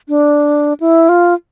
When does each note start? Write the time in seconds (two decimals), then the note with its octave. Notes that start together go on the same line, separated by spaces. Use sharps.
0.09 D4
0.80 E4
1.09 F4